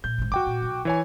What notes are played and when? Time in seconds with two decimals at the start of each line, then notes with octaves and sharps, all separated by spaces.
0.04 A#2 G6
0.18 G#1 G#2
0.32 F3 F#4 G5 D6
0.46 A#2
0.62 B1
0.85 E3 C#5 G#5